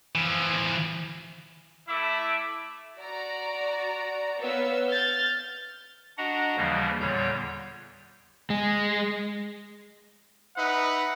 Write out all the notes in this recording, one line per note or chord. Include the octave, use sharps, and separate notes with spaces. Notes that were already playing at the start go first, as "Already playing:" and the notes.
E3 F3
A3 E4 E5 D6
F#4 D5 A#5
B3 B4 C#5 F5 E6
F6 G6 A6
D4 F#4 D#5 F#5 A#5
D#2 C#3 E3 F3 G3 A#3
E2 A#2 D3 G3 C#5 G6
G#3
D#4 B4 E5 F#5